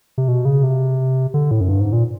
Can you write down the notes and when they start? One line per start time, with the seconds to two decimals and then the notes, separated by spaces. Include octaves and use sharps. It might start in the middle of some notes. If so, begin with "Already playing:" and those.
0.18 C3
0.28 B2
0.45 C#3
0.63 C3
1.34 D3
1.51 A2
1.61 F#2
1.69 G2
1.81 G#2
1.93 A#2